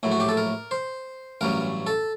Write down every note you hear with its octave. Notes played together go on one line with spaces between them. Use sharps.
A#1 A2 F#3
F#4
G4
A4
A#4
C5
A1 G2 F#3 A#4
A4